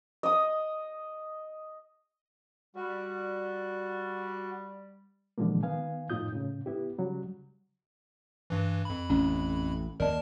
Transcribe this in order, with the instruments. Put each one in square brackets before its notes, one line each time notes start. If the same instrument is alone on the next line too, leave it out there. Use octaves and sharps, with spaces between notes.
[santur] D#5 D#6
[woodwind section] G3 [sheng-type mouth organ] F#4
[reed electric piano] A#2 D3 E3 F3 G#3 A#3
D#3 B3 F5 G#5
F2 A2 D#4 F4 D#6 G6
A2 C#3
B3 E4 G4
C#3 F#3 G3
[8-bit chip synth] G2 E3
F2 B5
[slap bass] A1 [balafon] C#4
[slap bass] D#2 A#3 [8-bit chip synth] A#4 A5 [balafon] D5 D#5